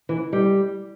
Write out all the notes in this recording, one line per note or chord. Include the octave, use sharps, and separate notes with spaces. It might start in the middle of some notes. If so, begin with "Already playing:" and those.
E3
G3